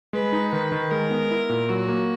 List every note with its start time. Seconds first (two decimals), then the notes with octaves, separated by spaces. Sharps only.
0.13 G#3 B4
0.33 D#4
0.53 D#3 B4
0.72 D#3
0.91 G#3 A#4
1.11 B3
1.31 E4
1.49 A#2
1.69 F#3 F#4
1.88 A#3